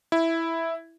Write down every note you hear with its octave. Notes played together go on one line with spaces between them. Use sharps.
E4